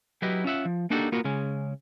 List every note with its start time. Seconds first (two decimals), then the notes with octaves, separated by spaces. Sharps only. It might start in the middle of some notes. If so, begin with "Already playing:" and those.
0.22 F#3 E4 G4 B4 D#5
0.44 C#4 F4 E5 F#5
0.65 F3
0.90 A#3 D4 D#4 F#4 G4 A4
1.12 A#3 B3 F4 F#4 A#4
1.25 C#3 G#3 C#4